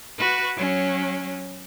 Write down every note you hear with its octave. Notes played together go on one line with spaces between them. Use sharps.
F#4 B4
F#3 C#4